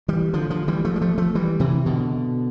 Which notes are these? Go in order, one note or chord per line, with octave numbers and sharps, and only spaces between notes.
E3 G3
D3 F3
D3 F3
E3 G3
F3 A3
G3
F3 A3
F3 A3
E3 G3
C3 E3
B2 D3